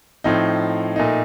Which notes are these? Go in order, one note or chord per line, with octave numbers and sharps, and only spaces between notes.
A2 F3 A3 C4 D#4
A#2 A3 D#4